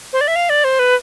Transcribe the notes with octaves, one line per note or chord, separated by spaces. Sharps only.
C5
D5
E5
F5
D5
C5
B4